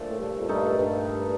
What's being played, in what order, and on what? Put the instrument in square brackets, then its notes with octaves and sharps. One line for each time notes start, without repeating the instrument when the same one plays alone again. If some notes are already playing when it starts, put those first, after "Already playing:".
Already playing: [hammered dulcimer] A#2 F3 A3 D4
[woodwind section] A2
G2
F2
[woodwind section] G2 [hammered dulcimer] A#2 A3 D#4 A4
[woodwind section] G2